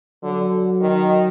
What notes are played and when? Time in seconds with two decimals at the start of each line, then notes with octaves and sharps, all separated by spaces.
0.23 D3 F#3
0.81 D#3